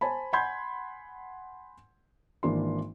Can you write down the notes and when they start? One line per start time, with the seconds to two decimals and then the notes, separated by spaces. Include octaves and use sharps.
0.01 C5 G#5 A5 B5
0.33 F#5 G#5 B5 C6 G6 G#6
2.43 G#1 E3 A#3 D4 C6